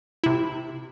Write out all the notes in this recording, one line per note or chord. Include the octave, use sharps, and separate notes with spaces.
C3 E4